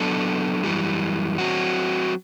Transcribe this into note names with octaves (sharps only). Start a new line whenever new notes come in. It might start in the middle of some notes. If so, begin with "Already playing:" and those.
Already playing: F#3 B3 D4 A4
F#2 E3 G3
F#3 C4 F#4